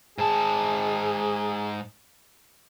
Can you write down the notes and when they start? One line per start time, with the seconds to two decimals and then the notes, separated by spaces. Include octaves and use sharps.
0.18 G#2 G#4 A5